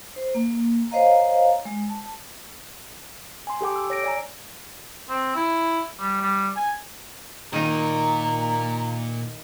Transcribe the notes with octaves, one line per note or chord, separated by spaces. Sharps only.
C5
A#3
C5 C#5 D#5 F5 A#5
G#3
A5
G#5 C6
G4 A4 G5 D6
E6
C#5 A#6 D7
D5 G#5 A#5
C4
E4
G3
G3
G#5
A#2 D#3 D#4 A#4 A#5